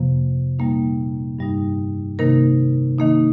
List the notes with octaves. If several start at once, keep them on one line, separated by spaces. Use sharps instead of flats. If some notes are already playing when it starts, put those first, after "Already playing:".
Already playing: F2 C3 F3 A#3
A#2 G3 A#3 D#4
G2 G3 D#4
C3 D#3 A#3 D#4 A#4
D#3 A#3 D#4